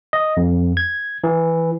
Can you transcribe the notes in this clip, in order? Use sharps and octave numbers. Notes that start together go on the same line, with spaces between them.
D#5
F2
G#6
E3